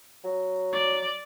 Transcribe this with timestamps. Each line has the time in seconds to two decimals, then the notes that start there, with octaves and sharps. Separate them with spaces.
0.24 F#3
0.73 D5